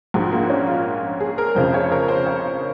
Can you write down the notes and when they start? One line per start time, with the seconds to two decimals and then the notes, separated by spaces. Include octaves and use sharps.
0.14 A#1 G#2 F3 F#4
0.32 A#3
0.50 C#4
0.67 F4
1.20 G#4
1.38 A#4
1.55 F1 F2 C#3 F3 C5
1.74 C#5
1.92 A#4
2.08 C5
2.26 C#5